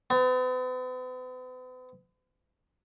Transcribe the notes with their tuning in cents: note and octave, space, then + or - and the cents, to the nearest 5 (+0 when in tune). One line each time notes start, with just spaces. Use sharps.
B3 +45